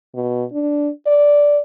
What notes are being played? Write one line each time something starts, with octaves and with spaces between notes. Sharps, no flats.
B2
D4
D5